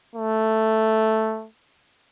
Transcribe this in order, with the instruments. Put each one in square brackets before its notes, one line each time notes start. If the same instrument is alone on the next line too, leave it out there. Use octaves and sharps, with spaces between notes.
[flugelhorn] A3